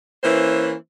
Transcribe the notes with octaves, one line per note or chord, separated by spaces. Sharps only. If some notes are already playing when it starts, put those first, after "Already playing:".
E3 A#3 C#4 E4 B4 C5